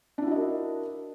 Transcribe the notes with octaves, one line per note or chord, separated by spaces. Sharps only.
D4 E4 F#4 A#4 D#5